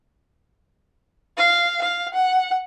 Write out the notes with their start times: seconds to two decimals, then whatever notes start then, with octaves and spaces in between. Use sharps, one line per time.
1.37 F5
1.81 F5
2.14 F#5